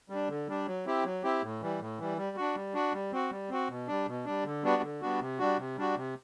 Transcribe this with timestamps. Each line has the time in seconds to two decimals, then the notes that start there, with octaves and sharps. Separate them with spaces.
0.10 G3 D4
0.29 D3
0.48 G3 D4
0.67 F#3
0.86 C4 E4 G4
1.04 F#3
1.23 C4 E4 G4
1.42 A2
1.61 E3 G3
1.80 A2
1.99 E3 G3
2.17 G3
2.37 D4 F#4
2.55 G3
2.74 D4 F#4
2.93 G3
3.12 C4 F#4
3.31 G3
3.50 C4 F#4
3.69 B2
3.88 G3 D4
4.06 B2
4.25 G3 D4
4.45 D3
4.63 G3 B3 D4 F#4
4.82 D3
5.01 G3 B3 D4 F#4
5.20 C3
5.39 G3 D4 F#4
5.58 C3
5.76 G3 D4 F#4
5.96 C3